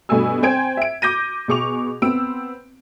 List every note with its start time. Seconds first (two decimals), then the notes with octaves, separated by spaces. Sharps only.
0.09 G2 B2 A3 G#5 E6
0.42 C4 C5 G5 G#5 G#6 D7
0.77 E5 D7
1.02 D6 G6 A#6 D#7
1.48 B2 G#4 C#6 D6 F7
2.02 B3 C4 E6 D7